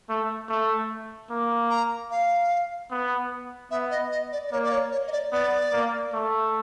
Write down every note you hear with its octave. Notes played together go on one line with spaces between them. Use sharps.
A3
A3
A#3
A#5
F5
B3
B3 E5
D#5
D#5
D5
D5
A#3 C#5
D5
C#5
C#5
D#5
D5
B3 D5
A#3
A3